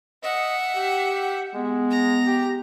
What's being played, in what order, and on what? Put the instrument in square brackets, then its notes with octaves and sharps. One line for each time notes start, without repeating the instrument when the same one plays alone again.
[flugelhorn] D#5 [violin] E5 F#5
[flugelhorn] G4
[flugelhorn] G#3 [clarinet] B3
[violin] A#5
[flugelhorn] G4